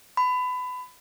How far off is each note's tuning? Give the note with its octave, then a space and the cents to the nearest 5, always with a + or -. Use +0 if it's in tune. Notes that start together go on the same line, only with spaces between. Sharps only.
B5 +25